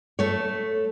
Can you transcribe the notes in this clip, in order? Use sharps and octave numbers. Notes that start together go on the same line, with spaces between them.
A3 C#5